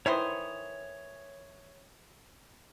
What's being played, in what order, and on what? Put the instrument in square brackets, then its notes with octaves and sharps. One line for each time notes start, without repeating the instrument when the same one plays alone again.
[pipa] D#3 E3 C5 [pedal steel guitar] C#5 D#6